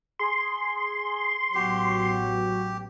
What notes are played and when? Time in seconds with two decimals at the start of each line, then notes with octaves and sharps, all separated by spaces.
0.19 G#4 C6
1.54 A1 F#3 B3 F#4 G4